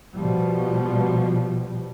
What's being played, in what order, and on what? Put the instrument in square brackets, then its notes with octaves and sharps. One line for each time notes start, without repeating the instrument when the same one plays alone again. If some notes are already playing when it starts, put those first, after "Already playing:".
[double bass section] B2 F3 G3